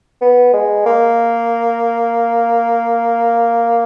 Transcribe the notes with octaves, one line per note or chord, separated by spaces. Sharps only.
B3
G#3
A#3